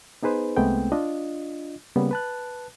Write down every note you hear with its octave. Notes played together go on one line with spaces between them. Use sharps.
B3 D#4 G#4 B4 C5
C2 G#3 A3 B3 C4 G5
D4 F4 D#5
C#3 G3 A#3 B3
B4 A5 F#6